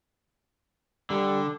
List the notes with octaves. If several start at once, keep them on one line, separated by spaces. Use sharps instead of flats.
D3 G3